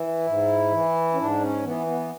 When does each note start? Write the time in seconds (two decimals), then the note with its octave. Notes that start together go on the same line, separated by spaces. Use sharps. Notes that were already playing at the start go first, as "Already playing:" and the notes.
Already playing: E3 E4
0.27 G#2
0.72 E3
1.14 C#4
1.18 G#2 D4
1.41 C#4
1.64 E3 B3
1.87 B3